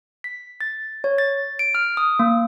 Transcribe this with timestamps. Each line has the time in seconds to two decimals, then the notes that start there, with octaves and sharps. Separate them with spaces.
0.24 B6
0.61 A6
1.04 C#5
1.18 A6
1.59 D7
1.75 F6
1.97 D#6
2.19 A#3